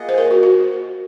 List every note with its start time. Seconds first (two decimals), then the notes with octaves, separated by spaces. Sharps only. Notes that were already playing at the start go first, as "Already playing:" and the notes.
Already playing: A#3 F4 G#4 D#5 F#5
0.09 C5
0.18 A#4
0.31 F#4
0.43 F#4